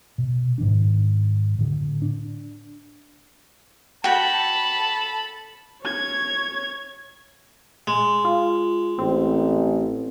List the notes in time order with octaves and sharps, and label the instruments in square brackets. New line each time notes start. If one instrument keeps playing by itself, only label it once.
[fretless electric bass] B2
G#2 D#3 D4
A2 D3
D4
[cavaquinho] F#4 G5 [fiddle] A4 B5 [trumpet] A5
[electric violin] C#5 G#6
[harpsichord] G#3
[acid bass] F4
[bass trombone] A1 [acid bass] C4